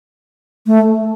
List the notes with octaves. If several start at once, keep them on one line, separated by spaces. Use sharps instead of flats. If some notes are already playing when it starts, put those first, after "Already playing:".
A3